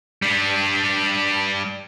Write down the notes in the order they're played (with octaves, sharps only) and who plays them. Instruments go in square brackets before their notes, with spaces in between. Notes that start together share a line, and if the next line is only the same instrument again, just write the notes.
[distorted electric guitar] G3 D4